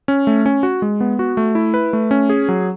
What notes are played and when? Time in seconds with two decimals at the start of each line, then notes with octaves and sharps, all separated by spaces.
0.08 C#4
0.27 A3
0.46 C#4
0.63 F#4
0.82 G#3
1.01 B3
1.19 F#4
1.37 A3
1.55 E4
1.74 B4
1.93 A3
2.11 C#4
2.30 G#4
2.49 F#3